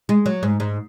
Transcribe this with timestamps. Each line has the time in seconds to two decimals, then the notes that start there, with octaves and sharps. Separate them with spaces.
0.09 G#3
0.26 F#3
0.43 G#2
0.60 G#2